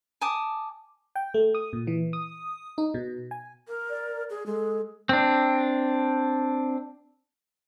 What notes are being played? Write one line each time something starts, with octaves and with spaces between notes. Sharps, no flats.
G#5 A5 D6 D#6
G5
A3
D#6
A#2
E3
D#6
D#4
B2
G#5
A#4
D5
G#4
G#3 A4
C4 D4